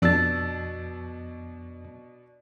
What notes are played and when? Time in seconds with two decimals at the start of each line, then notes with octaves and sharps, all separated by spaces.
0.02 F2 B2 D4 E6 A6